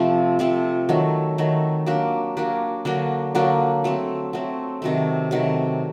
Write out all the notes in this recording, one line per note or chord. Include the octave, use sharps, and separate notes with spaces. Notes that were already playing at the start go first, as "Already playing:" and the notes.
Already playing: C3 F3 A3 C4
C3 F3 A3 C4
D#3 F#3 A3
D#3 F#3 A3
F#3 A#3 D4 G4
F#3 A#3 D4 G4
D3 F#3 A#3 D4
D3 F#3 A#3 D4
F#3 A3 C4
F#3 A3 C4
C3 D#3 F#3 A3
C3 D#3 F#3 A3